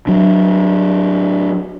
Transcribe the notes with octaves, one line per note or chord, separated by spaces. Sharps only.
F#3 D4